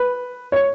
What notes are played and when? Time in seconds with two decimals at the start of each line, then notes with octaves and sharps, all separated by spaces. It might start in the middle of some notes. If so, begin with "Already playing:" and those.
Already playing: B4
0.52 C#5